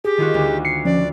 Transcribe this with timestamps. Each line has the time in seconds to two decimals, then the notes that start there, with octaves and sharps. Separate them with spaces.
0.05 G4 G#4
0.18 D#3 F4 F#4
0.34 D2
0.65 C7 C#7
0.85 F3 C#4 D5